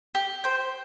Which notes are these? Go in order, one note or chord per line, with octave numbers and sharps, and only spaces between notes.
G4
C5 G5